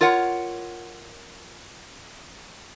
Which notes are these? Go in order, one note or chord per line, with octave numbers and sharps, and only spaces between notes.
F4 A#4 C#5 F#5